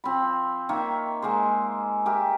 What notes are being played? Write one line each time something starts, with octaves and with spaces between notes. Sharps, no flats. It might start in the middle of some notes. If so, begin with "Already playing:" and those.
F3 C4 B5
D#3 A#3 C#5 E5
G#3 A#3 G#4 C5
G4 A#4 E5